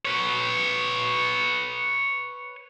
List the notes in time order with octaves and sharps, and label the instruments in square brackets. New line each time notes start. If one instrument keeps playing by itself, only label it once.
[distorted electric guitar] B4 C#5